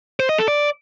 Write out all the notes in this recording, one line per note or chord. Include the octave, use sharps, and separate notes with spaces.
C5
D#5
A4
D5